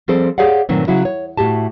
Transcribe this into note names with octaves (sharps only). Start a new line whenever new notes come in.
F3 G3 C4 G#4 A4 C5
G4 G#4 C#5 D5 F5 F#5
G2 A#2 D#3 F#3 A3 C4
C#3 F#3 E4 F#4
C#5
A2 F#4 G4 A5